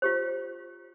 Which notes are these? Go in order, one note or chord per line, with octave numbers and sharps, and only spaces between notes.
F4 G4 C5